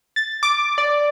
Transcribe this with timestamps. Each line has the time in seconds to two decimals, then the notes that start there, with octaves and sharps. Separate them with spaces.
0.16 A6
0.43 D6
0.78 D5